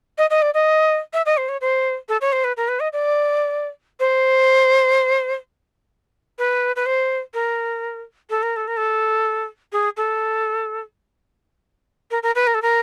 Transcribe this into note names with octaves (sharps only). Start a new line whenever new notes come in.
D#5
D#5
D5
D#5
E5
D#5
C5
C#5
C5
A4
C#5
C5
B4
A#4
B4
D#5
D5
C5
B4
B4
C5
A#4
A4
A#4
A4
A#4
A4
G#4
A4
A#4
A#4
B4
A#4
A4
A#4